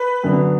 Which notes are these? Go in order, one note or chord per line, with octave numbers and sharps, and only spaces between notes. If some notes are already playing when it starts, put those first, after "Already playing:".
Already playing: B4
F#2 D3 B3